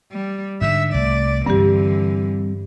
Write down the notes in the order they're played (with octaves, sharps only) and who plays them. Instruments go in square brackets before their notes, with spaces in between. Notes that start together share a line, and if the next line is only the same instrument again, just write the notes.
[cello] G3
[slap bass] G#2 D3 [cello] E5
[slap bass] C2 [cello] A3 D5
[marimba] G2 G4 [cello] D3 E3 [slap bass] G3 A#3 C4